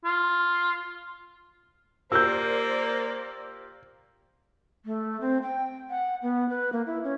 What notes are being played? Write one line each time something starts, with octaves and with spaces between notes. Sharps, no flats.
F4
A#3 F4 G4 A#4 C5 D5 E6 G6
A3
C4
G5
F#5
B3
B4
A#3
E4
C#4